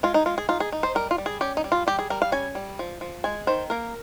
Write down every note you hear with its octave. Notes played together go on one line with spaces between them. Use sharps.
G#3 F4
D#4
G#3 F4
G#4
D#4 F4
G#4
D#4
C5
G3 A#4
F4
G3
G#4
C#4 G4
D#4
G3
F4
G3 G4
G#4
G3 A#4
F5
C#4 G#5
G3
F3
F3
G#3 G#5
D#3 C5
A#3 A#4